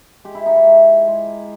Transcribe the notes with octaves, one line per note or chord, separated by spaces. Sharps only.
G#3 G4
E4
D#4
E4
G#3
G#3